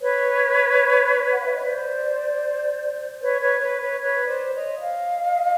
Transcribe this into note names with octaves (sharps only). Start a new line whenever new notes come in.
B4 C#5
F#5
F5
E5
D#5
C5 D5
B4 C#5
B4 C#5
B4 C#5
B4 C#5
B4 C#5
C5 D5
C#5 D#5
D#5 F5